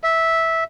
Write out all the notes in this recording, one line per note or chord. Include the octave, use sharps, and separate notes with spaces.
E5